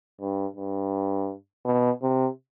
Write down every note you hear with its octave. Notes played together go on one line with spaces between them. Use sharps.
G2
G2
B2
C3